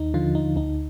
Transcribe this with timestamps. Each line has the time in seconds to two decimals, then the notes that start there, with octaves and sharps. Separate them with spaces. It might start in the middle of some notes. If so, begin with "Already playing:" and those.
Already playing: D#2 D#4
0.14 D3 F3 F4
0.35 D#4
0.56 D2 D#4